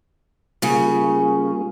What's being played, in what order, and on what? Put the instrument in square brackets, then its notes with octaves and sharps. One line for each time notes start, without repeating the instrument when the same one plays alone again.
[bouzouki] C#3 C#4 [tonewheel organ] G3 A#3 F4